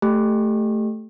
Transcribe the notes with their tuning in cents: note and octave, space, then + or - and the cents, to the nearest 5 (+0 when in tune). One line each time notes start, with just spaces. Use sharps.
A3 +0 G4 +0